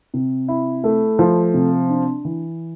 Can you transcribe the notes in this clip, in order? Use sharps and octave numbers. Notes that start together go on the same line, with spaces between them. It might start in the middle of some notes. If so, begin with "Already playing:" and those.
C3
E4
A3
F3
C3
D4
E3